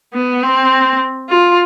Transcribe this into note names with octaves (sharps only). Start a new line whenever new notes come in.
B3
C4
F4